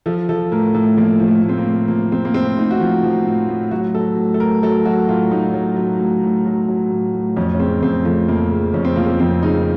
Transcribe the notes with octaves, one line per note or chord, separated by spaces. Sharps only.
F3 A4
F3 A4
A2 A#4
A2 A4
F3 A#3
F3
A3
A2
C4
A#3
A2
F3 A#3
F3 C4
A#3
A2 C4
A2 D#4
F#4
F3 F4
F3
A2
A2
F#3 F#4
F#3 A4
A2
A4
A2 A#4
F#3 A4
F#3 F#4
A2 F4
A2 D#4
F#3
F#3
A2
A2
F#3
F#3
A2
A2
F2 C#4
C#4
C#3 C4
F2 C4
F3 A3
F2 A#3
C#3
F2 C#4
C4
F3 A#3
C4
F2 C4
C#3 D#4